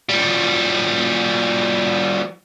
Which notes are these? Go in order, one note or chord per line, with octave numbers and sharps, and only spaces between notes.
F3 G3